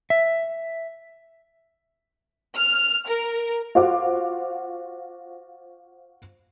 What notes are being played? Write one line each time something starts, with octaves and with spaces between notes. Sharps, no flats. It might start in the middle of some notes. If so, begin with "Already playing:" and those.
E5
F6
A#4
F4 F#4 C5 F#5 D6